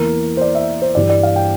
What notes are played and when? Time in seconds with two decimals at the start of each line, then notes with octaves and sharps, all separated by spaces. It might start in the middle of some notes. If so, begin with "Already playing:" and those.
Already playing: E2 E3 A#3 A#4
0.37 C5
0.41 D5
0.55 E5
0.82 C5
0.95 G2 E3 G3 D5
1.10 D5
1.23 F5
1.36 G5